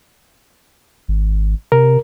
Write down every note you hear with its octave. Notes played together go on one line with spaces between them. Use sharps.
G#1
C3 A#4